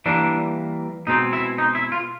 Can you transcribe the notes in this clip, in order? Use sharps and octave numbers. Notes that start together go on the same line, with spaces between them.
E3 G3 A#3 D4
B2 G#3 C4 D#4
E4
D#4
E4
F4